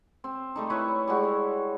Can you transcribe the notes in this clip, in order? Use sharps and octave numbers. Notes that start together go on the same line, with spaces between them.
C4
G3 A3 D#4
E4 B4 C#5 E5
G3 G#3 F#4
C#5